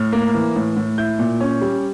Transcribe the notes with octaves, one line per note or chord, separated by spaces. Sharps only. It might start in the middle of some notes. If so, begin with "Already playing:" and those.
Already playing: A2 F6
A#3
E3
A2
A2
E4 G6
A#2
C#4
G3